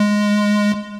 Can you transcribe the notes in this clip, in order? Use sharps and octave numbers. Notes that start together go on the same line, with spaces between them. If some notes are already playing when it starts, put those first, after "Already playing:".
Already playing: G#3